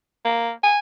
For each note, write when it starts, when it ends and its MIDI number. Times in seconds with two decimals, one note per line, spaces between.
0.25 0.51 58
0.63 0.79 80